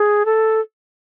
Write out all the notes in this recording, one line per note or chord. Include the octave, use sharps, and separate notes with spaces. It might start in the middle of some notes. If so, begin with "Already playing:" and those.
Already playing: G#4
A4